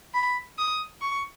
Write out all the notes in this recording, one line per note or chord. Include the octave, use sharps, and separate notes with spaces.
B5
D#6
C#6